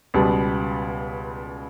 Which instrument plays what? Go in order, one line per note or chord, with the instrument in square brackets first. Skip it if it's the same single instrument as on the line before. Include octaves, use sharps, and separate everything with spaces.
[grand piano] C#2 B2 G3 B3